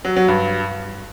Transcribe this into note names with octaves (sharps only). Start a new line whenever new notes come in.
F#3
F#3
G2